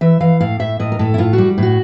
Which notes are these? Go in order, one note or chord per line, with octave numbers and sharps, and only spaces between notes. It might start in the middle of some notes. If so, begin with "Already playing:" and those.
E3 E5
E3 F5
A2 F5
A2 E5
A2 D#5
A#4
A2 A4
E4
A2 F4
F#4
G3
A2 F#4